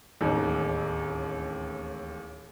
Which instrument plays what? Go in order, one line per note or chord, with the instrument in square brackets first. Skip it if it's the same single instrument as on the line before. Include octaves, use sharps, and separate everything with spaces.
[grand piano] D1 A1 D#2